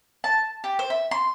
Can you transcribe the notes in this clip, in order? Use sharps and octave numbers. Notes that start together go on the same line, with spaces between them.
A5
G4
C5
E5
C6